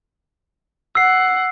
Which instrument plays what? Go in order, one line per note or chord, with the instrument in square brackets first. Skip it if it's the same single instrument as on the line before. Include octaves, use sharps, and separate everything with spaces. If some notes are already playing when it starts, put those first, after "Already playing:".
[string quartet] F#5 [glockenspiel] E6 C7